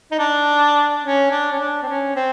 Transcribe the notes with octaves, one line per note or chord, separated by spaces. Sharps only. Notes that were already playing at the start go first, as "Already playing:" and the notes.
D#4
D4
C#4
D4
C#4
D4
C4
C#4
C4